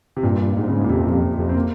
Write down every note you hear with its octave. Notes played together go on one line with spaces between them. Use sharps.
C3
G2 A#2
G#2
C#3
A#2
F2 C3
F2
C3
F2 C3
C4
A#3